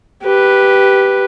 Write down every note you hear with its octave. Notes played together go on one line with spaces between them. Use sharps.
G4 B4